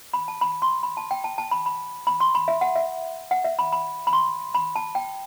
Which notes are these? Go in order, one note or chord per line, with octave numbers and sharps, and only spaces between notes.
B5
A5
B5
C6
B5
A5
G5
A5
A5
B5
B5
B5
C6
B5
E5
F#5
E5
F#5
E5
B5
B5
B5
C6
B5
A5
G5